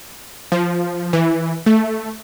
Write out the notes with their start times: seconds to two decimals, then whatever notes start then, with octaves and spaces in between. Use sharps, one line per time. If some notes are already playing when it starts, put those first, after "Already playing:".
0.52 F3
1.13 E3
1.66 A3